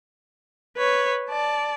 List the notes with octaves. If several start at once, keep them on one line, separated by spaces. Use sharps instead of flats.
B4 C#5
D5 A5